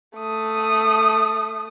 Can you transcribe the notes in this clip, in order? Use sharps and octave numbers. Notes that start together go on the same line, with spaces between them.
A3 D#6